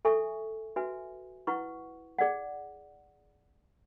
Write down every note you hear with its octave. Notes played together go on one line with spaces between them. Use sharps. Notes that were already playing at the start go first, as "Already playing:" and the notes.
A4 E5 G#5 C#6
F#4 B4 E5 G#5
E4 B4 F#5 C#6
G#4 D5 F#5